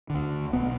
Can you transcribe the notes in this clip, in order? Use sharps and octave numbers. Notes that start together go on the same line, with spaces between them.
D2 D3
B1 B2 B3